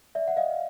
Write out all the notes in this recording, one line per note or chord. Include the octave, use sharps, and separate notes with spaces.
D5 E5
F#5
D#5 F5